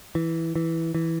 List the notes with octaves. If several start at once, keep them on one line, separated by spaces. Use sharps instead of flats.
E3
E3
E3